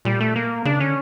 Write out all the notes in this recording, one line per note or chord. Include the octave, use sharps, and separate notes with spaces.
A#2 G3
A3
A#3
C#3 D4
D3 C#4